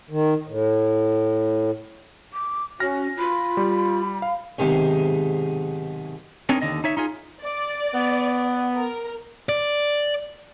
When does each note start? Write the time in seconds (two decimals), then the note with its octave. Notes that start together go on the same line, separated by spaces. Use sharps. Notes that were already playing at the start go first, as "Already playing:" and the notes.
0.10 D#3
0.47 A2
2.33 D6
2.80 C#4 F#4 F6 A#6
3.19 F4 B5
3.57 G3
4.22 F5
4.59 B1 G#2 C3 D#3 G#3
6.49 B3 C4 D4 D#4 A#4 C#5
6.62 D#2 D3 D#5
6.84 D#4 C#5 E5
6.97 D#4 F4 G#4
7.42 D5
7.94 B3
8.75 A#4
9.49 D5